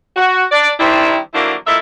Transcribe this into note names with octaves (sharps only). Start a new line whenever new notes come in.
F#4
D4 D5
D#3 G3 C4 D4 E4
D3 F3 F#3 A#3 D4 E4
F3 A#3 E4 A4 D#5 E5